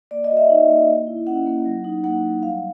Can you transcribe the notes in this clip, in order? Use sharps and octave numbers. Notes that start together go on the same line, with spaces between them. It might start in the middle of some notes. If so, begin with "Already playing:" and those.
A#3 D5
D#5
F#4
E5
D#4
A#3
A#3
E4
C#4 F#5
A#3
F#3
D#4
A#3 F#5
F#3
G3 F5